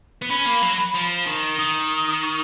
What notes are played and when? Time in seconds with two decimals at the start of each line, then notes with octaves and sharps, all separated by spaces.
0.22 B3
0.30 C#4 B5
0.46 A#3
0.62 F#3
0.94 F3
1.26 D#3
1.58 D#3 D#6
2.22 C#6